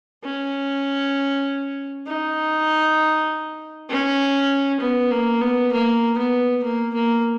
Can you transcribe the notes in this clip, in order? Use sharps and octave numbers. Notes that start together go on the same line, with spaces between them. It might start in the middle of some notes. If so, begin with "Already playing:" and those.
C#4
D#4
C#4
B3
A#3
B3
A#3
B3
A#3
A#3